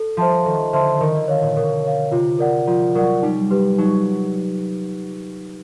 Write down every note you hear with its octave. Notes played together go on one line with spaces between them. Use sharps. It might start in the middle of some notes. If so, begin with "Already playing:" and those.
Already playing: A4
F3 C5 E5 A5 C6
D#3 A4
D3 C5 E5 A5 C6
D#3 A#4
D3
C#5 F5
A#2
B2 A#4
C#5 F5
C3 F4
A#4 D5 F#5
F3 F4
F#3 A#4 D5 F#5
G3 D#4
G4 B4
F#3 D#4